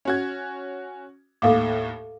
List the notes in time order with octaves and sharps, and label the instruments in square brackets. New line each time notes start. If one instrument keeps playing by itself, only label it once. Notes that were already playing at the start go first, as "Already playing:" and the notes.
[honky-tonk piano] C#4 F#4 G#6
[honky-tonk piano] D#2 A2 [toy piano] A4 F5 D6